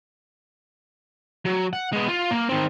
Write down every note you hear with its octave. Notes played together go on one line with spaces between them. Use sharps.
F#3
F#5
G#3 B3
F4
A#3
D#3 C4